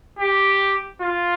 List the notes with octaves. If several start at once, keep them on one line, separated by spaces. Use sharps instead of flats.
G4
F4